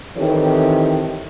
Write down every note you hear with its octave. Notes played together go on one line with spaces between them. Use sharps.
D#3 E3 C4 G4 A4 C#5